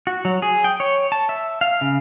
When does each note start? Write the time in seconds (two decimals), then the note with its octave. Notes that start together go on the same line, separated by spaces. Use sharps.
0.07 F#4
0.25 F#3
0.42 G#4
0.64 G5
0.80 C#5
1.12 A5
1.29 E5
1.61 F5
1.81 C#3